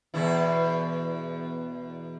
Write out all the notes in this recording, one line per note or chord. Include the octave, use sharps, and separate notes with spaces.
E2 B2 E4